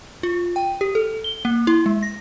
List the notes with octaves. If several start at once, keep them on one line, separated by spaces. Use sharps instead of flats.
F4
G5
G4
A4
G7
A#3
E4
G#3
A#6